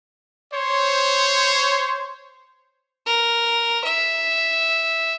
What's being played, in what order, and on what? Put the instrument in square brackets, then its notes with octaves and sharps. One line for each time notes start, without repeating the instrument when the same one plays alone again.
[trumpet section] C5 C#5
[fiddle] A#4
E5